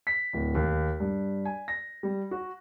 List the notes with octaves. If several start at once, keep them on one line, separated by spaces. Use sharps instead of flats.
B6
D1
D#2
G2
G#5
A#6
G3
F#4